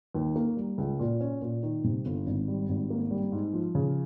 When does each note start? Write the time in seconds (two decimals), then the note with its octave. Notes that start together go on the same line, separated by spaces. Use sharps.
0.14 D#2
0.36 A#3
0.57 G3
0.78 C#2
0.99 A#2
1.21 C#4
1.41 A#2
1.63 D#3
1.84 C3
2.06 G1
2.27 G#1
2.48 G3
2.69 G#1
2.90 A#3
3.11 G3
3.32 G#2
3.53 F3
3.75 C#3